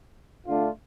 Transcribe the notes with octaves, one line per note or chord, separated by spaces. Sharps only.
D3 A3 D4 F4